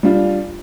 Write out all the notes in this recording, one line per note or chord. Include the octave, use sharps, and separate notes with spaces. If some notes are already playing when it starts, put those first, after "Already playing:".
G3 D4 F4